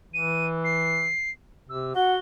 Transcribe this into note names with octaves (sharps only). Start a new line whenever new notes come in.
E3 D#7
C7
C3 E6
F#4 F#5 G7